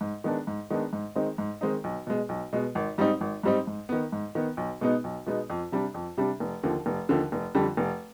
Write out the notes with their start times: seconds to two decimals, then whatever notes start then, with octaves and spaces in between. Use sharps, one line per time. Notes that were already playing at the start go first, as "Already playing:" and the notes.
0.01 G#2
0.24 D#3 G#3 B3 D4
0.47 G#2
0.70 D#3 G#3 B3 D4
0.93 G#2
1.16 D#3 G#3 C4 D#4
1.38 G#2
1.61 D#3 G#3 C4 D#4
1.84 B1
2.07 B2 G#3
2.29 B1
2.53 B2 G#3
2.75 G#1
2.98 G#2 G3 C4 D#4
3.21 G#1
3.43 G#2 G3 C4 D#4
3.67 G#2
3.89 D#3 B3
4.12 G#2
4.35 D#3 B3
4.57 B1
4.81 B2 G#3 B3 D#4
5.04 B1
5.26 B2 G#3 B3 D#4
5.50 F2
5.72 C3 G3 D4
5.94 F2
6.18 C3 G3 D4
6.40 F1
6.63 D#2 D3 F3
6.86 F1
7.09 D#2 D3 F3
7.32 F1
7.55 F2 D3 G3
7.77 F1